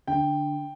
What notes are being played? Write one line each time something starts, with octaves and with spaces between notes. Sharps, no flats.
D3 G5